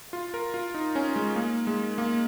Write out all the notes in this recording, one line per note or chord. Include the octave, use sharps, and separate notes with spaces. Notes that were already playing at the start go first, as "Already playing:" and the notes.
F4
A#4
F4
D#4
C#4
G#3
A#3
G#3
A#3